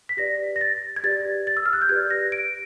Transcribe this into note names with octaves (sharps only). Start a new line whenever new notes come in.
B6
G4 B4 D5 A#6
A#6
A6
G#6
G4 B4 D5 A6
A6
E6
F6
F#6
G6
G4 B4 D5 G#6
A#6
D7